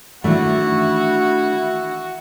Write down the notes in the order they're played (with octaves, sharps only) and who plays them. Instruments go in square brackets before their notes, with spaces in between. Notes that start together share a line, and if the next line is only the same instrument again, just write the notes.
[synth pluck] D#3 E3 [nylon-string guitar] A3 D4 [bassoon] E4 [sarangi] F#4